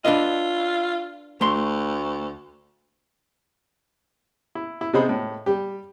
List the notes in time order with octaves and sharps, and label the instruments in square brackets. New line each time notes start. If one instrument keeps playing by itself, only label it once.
[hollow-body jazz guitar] D4 B4 D#5 [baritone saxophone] F4
[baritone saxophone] D2 [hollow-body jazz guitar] A3 C6
[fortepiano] E4
E4
C3 B3 D#4 G#4 C5 B5
A2
G3 G4